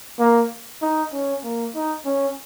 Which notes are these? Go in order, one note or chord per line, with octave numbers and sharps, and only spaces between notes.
A#3
D#4
C#4
A#3
D#4
C#4